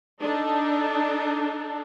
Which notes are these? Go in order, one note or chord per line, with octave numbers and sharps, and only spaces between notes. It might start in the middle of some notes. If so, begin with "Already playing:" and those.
D4 D#4 A4